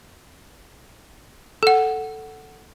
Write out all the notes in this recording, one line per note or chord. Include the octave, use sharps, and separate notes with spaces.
A4 F#5